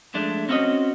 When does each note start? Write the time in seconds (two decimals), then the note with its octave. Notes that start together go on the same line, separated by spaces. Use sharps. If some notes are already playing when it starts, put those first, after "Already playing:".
0.14 F3 G#3 A3 D4
0.49 C4 C#4 E4 F#4 C#5 D#5